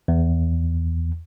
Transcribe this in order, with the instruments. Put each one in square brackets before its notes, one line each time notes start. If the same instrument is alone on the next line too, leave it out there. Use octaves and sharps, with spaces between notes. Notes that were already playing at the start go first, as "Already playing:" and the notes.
[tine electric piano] E2